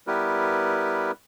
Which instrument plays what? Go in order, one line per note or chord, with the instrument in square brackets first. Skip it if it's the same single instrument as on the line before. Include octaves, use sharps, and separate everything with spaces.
[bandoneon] G3 B3 E4 G4 A#4 B4